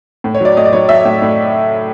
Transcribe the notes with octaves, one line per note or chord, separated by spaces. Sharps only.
A2
C#5
F#3 D5
A2 D#5
D5
F#3 C#5
F#3 E5
A2
A2